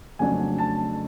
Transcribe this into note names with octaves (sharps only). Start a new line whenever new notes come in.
F2 C#3 F#3 A3 D4 G#5
A5